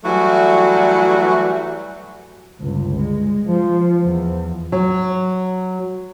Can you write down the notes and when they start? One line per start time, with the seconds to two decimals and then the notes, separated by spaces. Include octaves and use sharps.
0.05 E3 F#3 G3 A3 E4 F#4
2.61 G1 C#2
2.98 G#3
3.47 F3
4.04 E2
4.72 F#3